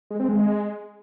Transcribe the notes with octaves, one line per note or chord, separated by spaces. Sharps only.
G#3
C4
G#3